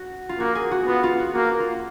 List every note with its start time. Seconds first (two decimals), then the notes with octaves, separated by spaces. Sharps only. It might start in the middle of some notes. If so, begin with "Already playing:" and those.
Already playing: F#4
0.29 F4
0.39 A#3 F#4
0.55 G#4
0.71 F#4
0.87 B3 F4
1.03 F4
1.19 F#4
1.35 A#3 F#4
1.60 F4